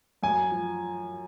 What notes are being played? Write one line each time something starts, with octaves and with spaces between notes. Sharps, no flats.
F#2 G#5
F3